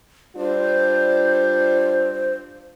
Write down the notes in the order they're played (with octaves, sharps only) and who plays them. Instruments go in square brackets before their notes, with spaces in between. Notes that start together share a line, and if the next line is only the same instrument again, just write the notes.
[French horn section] G3 D4 F4 [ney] C5